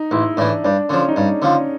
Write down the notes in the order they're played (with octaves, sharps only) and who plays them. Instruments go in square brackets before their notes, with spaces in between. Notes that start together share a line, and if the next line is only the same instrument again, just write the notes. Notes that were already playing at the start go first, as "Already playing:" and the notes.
Already playing: [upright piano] D#4
[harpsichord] A1 [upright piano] E4
[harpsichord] A2 E3 [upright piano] D4
[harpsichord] G2 [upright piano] D4
[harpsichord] D3 F3 [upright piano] C#4
[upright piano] D#4
[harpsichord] G2 [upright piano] D4
[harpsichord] D3 F3 [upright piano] C#4